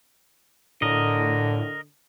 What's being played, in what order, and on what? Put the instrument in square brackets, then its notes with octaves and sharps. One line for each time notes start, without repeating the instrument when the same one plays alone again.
[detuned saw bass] A2 [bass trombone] D3 [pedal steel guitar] A#4 D#5